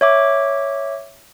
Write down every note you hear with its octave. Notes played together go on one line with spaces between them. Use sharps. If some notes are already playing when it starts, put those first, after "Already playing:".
C#5 E5 D6